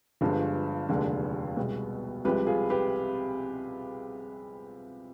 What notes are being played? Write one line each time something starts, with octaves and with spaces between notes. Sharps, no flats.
G1 G2 D3 F3 G#3
F1 D#2 D3 G#3
C2 B2 G#3
C2 C3 F3 G#3 G4 B4
F4 G#4
G4 B4